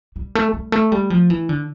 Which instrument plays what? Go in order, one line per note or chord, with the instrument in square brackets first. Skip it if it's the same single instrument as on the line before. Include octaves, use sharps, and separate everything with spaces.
[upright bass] G3
A3
G3
A3
G3
F3
E3
D3